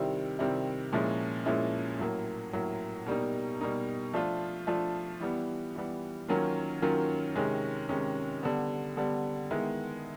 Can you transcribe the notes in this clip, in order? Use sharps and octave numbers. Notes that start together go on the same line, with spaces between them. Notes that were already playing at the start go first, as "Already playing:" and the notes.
Already playing: C3 D#3 G3 C4 E4
C3 D#3 G3 C4 E4
A#2 F3 G#3 C#4 E4
A#2 F3 G#3 C#4 E4
A2 F#3 A#3
A2 F#3 A#3
B2 G3 A#3 D#4
B2 G3 A#3 D#4
F3 A3 D4 F4
F3 A3 D4 F4
E3 G3 B3
E3 G3 B3
D#3 F#3 A#3 C#4 F4
D#3 F#3 A#3 C#4 F4
C3 D#3 G#3 C#4
C3 D#3 G#3 C#4
D3 G3 B3
D3 G3 B3
D#3 G#3 B3 E4